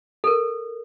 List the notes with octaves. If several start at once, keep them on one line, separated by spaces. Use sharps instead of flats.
A4 A#4